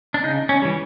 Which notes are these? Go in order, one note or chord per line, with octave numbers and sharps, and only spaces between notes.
D4
C#3 D#4
C#4
E3 G3